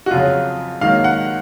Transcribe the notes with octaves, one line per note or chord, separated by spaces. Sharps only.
F#4
F2 C#3 F#3 F4
G#2 D#3 F#3 A#3 F5
F#5